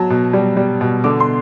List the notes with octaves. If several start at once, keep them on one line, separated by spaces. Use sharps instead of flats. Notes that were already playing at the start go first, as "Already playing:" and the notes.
Already playing: F#3 A5
B2
G3
G3
B2
D3 D6
C6